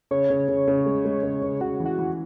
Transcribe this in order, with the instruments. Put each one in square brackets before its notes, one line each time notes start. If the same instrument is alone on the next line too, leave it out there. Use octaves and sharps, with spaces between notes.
[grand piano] C#3 [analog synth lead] C#5
[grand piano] C#3
C#3
C#3
G#3
G#3
C#3
C#3
[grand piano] C#3 [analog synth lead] F#4
[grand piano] E3
[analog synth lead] F#4
[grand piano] E3